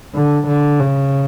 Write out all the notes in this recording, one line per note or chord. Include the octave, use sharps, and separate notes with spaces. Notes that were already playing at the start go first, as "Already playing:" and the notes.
D3
D3
C#3